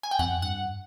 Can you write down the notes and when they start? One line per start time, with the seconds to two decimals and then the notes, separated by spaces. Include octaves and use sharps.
0.03 G#5
0.11 G5
0.19 F2 F#5
0.42 G2 F#5